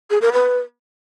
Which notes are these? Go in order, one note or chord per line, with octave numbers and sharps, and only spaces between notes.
G#4
A#4
B4